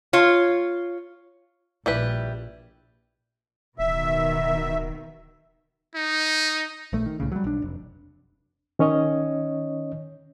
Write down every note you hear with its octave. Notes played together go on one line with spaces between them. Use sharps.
F4 C#5
A#1 G3 E4 B4
D1 B2 D#3 E5
D#4
A#1 A3
D#3
C2 A2 C#3
F#3 G3
B1 D4
F1
D#3 C#4 C#5 D#5